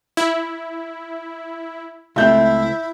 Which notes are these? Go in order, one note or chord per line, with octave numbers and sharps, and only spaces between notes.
E4
C#2 A3 C4 E4 E5 G6